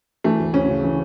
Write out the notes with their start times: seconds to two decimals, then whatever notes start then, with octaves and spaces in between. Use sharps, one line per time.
0.24 E3 A3
0.39 D2
0.54 D2 C#4
0.69 C#3
0.83 E3